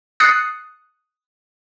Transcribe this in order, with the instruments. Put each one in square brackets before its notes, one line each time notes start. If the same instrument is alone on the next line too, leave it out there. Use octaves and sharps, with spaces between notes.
[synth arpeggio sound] D#6 F#6 A6 C7 C#7